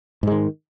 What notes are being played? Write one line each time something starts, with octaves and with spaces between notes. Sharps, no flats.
G#2 D#3 G#3